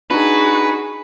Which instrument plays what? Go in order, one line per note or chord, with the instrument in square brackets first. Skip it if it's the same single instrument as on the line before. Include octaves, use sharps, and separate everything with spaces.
[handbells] D4 D#4 [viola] F#4 G#4 [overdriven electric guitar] B4